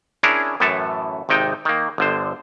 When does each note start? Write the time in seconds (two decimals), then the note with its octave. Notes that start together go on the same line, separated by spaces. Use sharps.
0.23 C#4 D4 E4 G#4 A#4
0.60 F#2 A2 E3 A4 E5 A5
1.29 G#1 C3 D#4 G5
1.65 D#3 A#3
1.98 G1 D3 C5